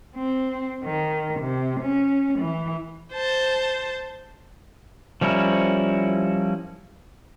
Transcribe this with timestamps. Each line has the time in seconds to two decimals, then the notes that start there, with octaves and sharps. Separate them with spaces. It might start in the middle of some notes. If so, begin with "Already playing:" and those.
0.16 C4
0.84 D#3
1.40 C3
1.81 C#4
2.39 E3
3.13 C5 A5
5.21 F3 G3 C#4 E4 A#4